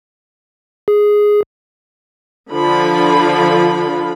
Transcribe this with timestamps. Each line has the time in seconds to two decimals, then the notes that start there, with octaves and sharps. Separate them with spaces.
0.88 G#4
2.51 D3 F3 F4 B5